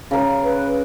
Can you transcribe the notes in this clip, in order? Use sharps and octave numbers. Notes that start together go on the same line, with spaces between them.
C#3 A#4
B4